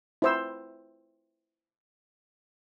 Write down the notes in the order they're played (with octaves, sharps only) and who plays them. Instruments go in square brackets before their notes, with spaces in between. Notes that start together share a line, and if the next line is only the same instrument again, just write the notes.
[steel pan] E4 C5 E6